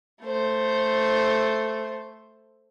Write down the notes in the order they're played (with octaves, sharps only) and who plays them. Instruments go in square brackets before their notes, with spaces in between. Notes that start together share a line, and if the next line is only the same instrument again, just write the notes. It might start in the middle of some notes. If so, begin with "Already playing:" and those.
[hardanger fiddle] A3 C5